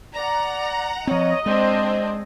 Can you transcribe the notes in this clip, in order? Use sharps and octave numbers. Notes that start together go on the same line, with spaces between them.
D5 F#5 A#5
F3 C4 C#5 D#5
G#3 C4 D4 D5